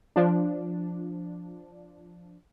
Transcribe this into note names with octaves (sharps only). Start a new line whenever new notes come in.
F3 D4